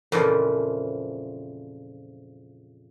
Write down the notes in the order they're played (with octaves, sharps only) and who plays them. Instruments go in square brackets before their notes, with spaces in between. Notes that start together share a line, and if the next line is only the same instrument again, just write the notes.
[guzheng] F2 A#2 C#3 E3 F3